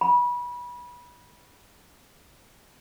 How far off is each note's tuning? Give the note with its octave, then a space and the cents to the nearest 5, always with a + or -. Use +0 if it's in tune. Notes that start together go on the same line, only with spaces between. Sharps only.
B5 -25